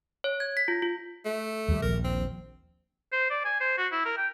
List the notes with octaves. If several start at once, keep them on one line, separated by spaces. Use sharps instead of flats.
C#5
G#6
B6
F4
F4
A3
D#2 G3
D#1 A#1 A#4
C4
C5
D5
G#5
C5
F#4
E4
A#4
G5